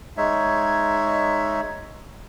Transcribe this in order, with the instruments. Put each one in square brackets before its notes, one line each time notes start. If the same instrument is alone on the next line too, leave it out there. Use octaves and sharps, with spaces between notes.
[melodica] G#3 D#4 C#5 E5